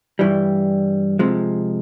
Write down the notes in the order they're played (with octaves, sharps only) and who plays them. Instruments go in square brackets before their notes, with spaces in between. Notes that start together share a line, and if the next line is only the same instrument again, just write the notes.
[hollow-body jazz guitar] G2 E3 G3
C3 F3 G#3